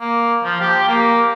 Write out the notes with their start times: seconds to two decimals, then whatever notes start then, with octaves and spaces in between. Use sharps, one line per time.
0.01 A#3
0.44 F3
0.61 G4
0.88 A#3